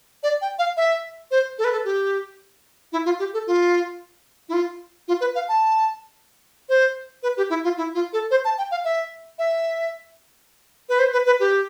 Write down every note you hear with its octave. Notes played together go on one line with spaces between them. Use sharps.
D5
G5
F5
E5
C5
A4
B4
A4
G4
E4
F4
G4
A4
F4
E4
F4
F4
B4
F5
A5
C5
B4
G4
E4
F4
E4
F4
A4
C5
A5
G5
F5
E5
E5
B4
C5
B4
B4
G4